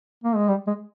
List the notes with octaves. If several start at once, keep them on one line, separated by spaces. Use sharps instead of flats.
A#3
G#3
G3
G#3